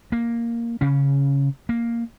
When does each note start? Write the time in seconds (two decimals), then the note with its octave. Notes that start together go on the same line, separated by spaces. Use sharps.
0.12 A#3
0.81 C#3 C#4
1.69 A#3